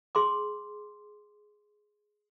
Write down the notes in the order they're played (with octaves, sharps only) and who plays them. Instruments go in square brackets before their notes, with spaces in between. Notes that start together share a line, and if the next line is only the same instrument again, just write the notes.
[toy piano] G#4 C6 D6